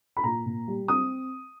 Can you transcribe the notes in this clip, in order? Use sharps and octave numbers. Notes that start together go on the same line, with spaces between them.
B5
A#2 A#5
A#2
G3
C4 D#6